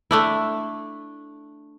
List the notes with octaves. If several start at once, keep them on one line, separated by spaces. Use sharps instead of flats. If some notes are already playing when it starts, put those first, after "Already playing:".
A3 D4 E4